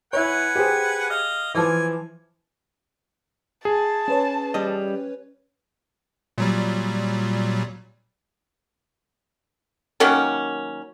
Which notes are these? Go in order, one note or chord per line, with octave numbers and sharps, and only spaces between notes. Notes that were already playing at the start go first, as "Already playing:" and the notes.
E4 B4 C#5 F#5 G#5
G4 G#4 C5
D#5 F5
E3 F3 D5 G#5
G#4 A5
C#4 B4 C#5
G3 D#5
A#2 F#3 G3
D#3 F#3 A#3 C#4